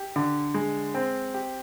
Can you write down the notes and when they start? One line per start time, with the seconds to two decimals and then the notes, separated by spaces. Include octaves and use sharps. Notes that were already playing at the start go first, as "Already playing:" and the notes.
Already playing: G4
0.16 D3
0.54 G#3
0.94 C4
1.34 G4